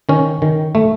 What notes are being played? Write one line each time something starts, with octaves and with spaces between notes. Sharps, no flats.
D#3 C#4
D#3
A3